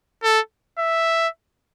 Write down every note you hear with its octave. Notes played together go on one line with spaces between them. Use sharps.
A4
E5